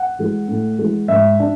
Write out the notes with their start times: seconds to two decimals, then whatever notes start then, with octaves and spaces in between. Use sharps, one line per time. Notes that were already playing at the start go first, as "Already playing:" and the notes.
Already playing: F#5
0.19 E3 G#3
0.48 A2
0.79 E3 G#3
1.08 G#2 E5
1.40 D4